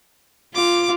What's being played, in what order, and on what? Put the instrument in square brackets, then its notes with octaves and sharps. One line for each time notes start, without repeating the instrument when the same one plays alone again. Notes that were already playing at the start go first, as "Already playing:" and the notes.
[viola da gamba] F4 [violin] D6